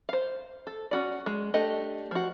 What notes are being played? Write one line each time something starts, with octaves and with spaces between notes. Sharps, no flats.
C5 F5
A4
C#4 F#4 D5
G#3
A3 D4 G4 D#5
F3 F#4